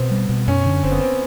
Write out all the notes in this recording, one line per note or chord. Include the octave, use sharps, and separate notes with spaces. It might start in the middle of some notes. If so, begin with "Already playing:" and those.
Already playing: B2 B3 C4
G3
B2
F#2 C#4
D3
F#1 C4
B3
C4